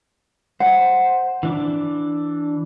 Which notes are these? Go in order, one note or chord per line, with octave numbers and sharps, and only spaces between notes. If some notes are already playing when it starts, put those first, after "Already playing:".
C5 F#5
E3 D4 D6